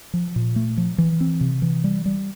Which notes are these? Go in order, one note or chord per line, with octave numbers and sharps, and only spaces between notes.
F3
A#2
A3
F3
E3
C4
C3
E3
G3
G3